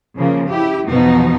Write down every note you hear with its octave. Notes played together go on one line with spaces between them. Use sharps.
C#3 F3 A#3
E4 G4
E2 B2 F3 D#4